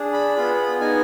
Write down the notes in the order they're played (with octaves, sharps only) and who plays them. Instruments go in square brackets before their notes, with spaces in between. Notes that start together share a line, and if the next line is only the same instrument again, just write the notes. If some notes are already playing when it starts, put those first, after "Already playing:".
Already playing: [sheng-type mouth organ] D4 G#4
B5
B3 F4 G#4
B3 D#4 G#4 G#5